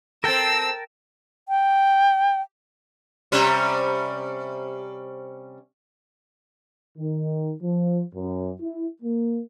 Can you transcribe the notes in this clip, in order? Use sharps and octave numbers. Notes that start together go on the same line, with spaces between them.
C4 A4 A#4 G5 A5 E6
G5
C3 G3 C#4
D#3
F3
F#2
E4
A#3